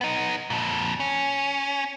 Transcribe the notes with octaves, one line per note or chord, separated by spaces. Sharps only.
B3 D#4
F2 A#2
C#4